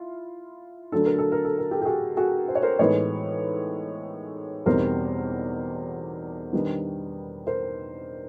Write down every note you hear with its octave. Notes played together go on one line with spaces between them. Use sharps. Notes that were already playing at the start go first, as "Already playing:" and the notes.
Already playing: E4 F4
D3 F#3 A3 D4 A4
A#4
A4
A#4
A4
A#4
G4 A4
G4
F#4 G#4
F#4 G#4
C5
C#5
A#4 C5
A2 E3 G#3 B3 D#4 B4 C#5
E2 B2 G3 C4 D#4 A#4 C5
D#3 G3 B3 D4
A#4 C5